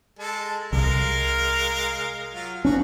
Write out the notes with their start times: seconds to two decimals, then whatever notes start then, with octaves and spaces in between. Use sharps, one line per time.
0.19 G#3 A4 A5
0.72 C2 G#3 A#4 F5
2.34 F#3 F4
2.65 F3 C#4 D4 F#4